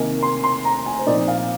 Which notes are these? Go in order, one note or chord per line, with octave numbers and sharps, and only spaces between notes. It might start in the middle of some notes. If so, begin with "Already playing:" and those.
Already playing: C3 D#3 A#3 D#4 G#5
C6
C6
A#5
G#5
C5
A#2 F3 C4 D#4 D5
F5